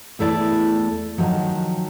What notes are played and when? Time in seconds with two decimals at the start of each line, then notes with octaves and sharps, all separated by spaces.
0.19 E2 A3 E4 D5
1.18 D#3 F3 F#3